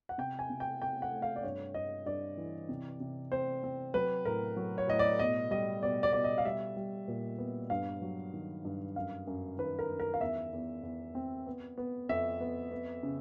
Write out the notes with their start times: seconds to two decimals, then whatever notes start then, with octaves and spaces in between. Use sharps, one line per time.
0.09 F#5
0.18 C3 G5
0.39 G#5
0.50 C3
0.60 G5
0.81 C4 G5
1.02 F#5
1.12 A3
1.22 F5
1.36 D5
1.43 G2 C#5
1.74 G2 D#5
2.06 G2 D5
2.37 E3
2.69 C3
3.00 C3
3.32 C4 C5
3.63 C4
3.94 F#3 B4
4.25 A2 A#4
4.57 F#3
4.78 C#5
4.88 A2 D#5
4.99 D5
5.19 B2 D#5
5.51 G3 D#5
5.82 B2 D5
6.03 D5
6.13 B2 D5
6.24 D#5
6.38 F5
6.45 G3 E5
6.77 G3
7.08 A#2
7.38 B3
7.70 G2 F5
8.02 F#3
8.33 D#3
8.65 G2
8.96 F#2 F5
9.27 F#2
9.58 D#3 B4
9.79 A#4
9.89 F#2
10.00 A#4
10.14 F5
10.20 E2 E5
10.53 E2
10.83 E2
11.15 C4
11.47 B3
11.78 B3
12.09 F2 E5
12.40 B3
12.71 B3
13.03 C#3